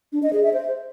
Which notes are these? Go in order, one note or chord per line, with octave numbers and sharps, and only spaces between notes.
D4
D#5
G#4
E5
C5